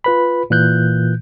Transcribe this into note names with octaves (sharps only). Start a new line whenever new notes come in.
F4 B4 B5
A#2 E3 F#6 G6